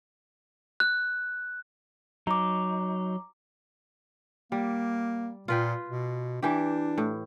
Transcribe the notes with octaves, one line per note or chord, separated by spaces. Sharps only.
F#6
F#3 D#4 A#5 D6
G3 A#3
A#2 F4 B4 G5
B2
E3 D4 G4
A2